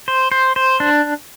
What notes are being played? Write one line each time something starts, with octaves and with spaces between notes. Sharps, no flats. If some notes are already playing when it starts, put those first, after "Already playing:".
C5
C5
C5
D4